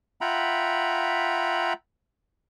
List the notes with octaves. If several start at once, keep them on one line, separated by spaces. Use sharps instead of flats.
F4 E5 F#5 G5 A#5 B5